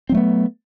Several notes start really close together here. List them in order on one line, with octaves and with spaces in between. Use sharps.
C4 F#3 A3 B3